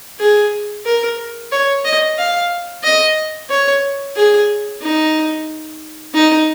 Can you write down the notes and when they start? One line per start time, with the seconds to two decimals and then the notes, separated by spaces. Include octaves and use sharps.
0.19 G#4
0.85 A#4
1.52 C#5
1.85 D#5
2.18 F5
2.84 D#5
3.50 C#5
4.16 G#4
4.82 D#4
6.14 D#4